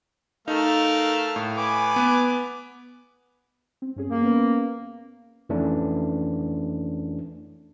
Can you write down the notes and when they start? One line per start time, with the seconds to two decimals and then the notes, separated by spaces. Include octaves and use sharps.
0.48 A3 D#4 A#4 F5
1.36 A2
1.57 B4 G#5 D6
1.96 B3
3.82 C4
3.96 G2 C#4 G#4
4.10 A#3
4.22 B3 C#4 B4
5.49 F2 E3 A3 C#4 D4